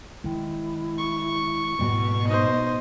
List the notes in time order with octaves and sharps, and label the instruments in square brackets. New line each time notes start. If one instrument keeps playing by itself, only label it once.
[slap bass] D#3 G#3 [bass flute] E4
[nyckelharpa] C#6
[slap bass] G#2 G3 A3 [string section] B2
[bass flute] D#4 [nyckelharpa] C5 D#5